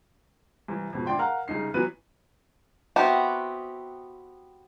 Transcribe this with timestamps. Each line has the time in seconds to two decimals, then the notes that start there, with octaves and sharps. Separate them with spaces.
0.68 C2 E3
0.93 F2 G#2 B2
1.06 A2 D3 D5 G5 C6
1.19 A#4 F5 F#5 A#5 F6
1.48 C2 C#3 D#4 C7
1.74 E3 F#3 B3 F#4 B4 D#7
2.96 B3 C4 E4 F#4 G4